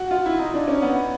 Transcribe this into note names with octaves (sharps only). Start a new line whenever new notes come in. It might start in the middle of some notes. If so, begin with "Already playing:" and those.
Already playing: F#4
F4
E4
D#4
D4
C#4
B3